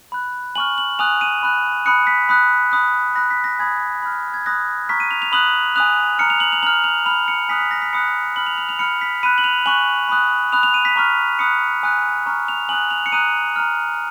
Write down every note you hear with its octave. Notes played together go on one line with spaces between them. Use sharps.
B5 F#6
G#5 C#6 F6 F#7
F#7
G#5 D#6 F#6 F7
D#7
B5 F#6
B5 D#6 F#6 C#7
B6
B5 D#6 F#6
B5 D#6 F#6
B5 D#6 F#6 A#6
B6
A#6
G#5 B5 D#6 G#6
B5 F6
G#6
B5 D#6 F#6 A#6
A#5 C#6 F6 B6
D#7
F7
F7
B5 D#6 F#6 F#7
G#5 D#6 F#6 F7
A#5 F6 C#7
F7
F#7
F7
A#5 F6 F#7
F7
B5 F6 F7
C#7
G#5 D#6 F#6 B6
B6
A#6
B6
B5 D#6 F#6 C#7
B5 F6 F#7
F7
F7
F7
B5 F6 C#7
B6
B5 F#6 D#7
F#7
F7
G#5 C#6 F#6 F#7
B5 D#6 F#6
B5 D#6 F#6 F7
F7
D#7
B6
A#5 C#6 F6
B5 D#6 F#6 C#7
G#5 D#6 F#6
A#5 C#6 F6
F7
G#5 D#6 F#6 F#7
F7
C#7
A#5 D#6 F#6 D#7
A#5 F6